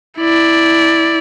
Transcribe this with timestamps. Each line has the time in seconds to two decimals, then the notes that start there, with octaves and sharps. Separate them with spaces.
0.18 E4 D5